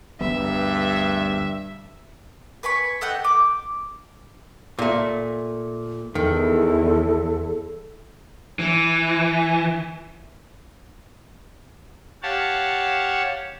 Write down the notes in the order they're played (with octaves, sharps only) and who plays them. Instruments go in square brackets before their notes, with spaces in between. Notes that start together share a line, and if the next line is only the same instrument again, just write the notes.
[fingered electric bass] D2 G3 B3 [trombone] G2 [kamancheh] E5
[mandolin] B4 G#5 B5 C#6
A4 D#5 F#5 G5
D6
[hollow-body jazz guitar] A#2 A3
[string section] E2 [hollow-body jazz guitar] D#3 [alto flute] A4
[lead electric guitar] E3
[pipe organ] G4 C#5 F5 F#5 A5